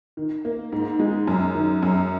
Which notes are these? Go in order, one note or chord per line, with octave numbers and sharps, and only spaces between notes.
D#3
A#3
G#2
G#3
F#2
D#3
F#2